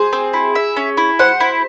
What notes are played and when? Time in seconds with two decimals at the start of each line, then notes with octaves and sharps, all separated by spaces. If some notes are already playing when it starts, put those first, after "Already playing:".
Already playing: G#4 C5
0.13 C4
0.34 E4
0.55 E5
0.76 C#4
0.97 E4
1.19 C5 F#5
1.40 E4